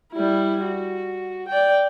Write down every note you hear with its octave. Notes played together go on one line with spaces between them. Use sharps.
G3 E4
F#4
D5 G5